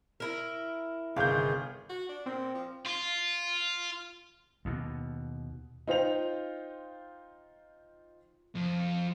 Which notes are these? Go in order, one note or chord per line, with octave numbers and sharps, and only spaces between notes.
E4 A#4
G1 C3 D#3 G#4 F5 G6
F#4
D4
A#2 C4
F3
F4
D#2 B2
D#4 F4 C5 G5 F7
F2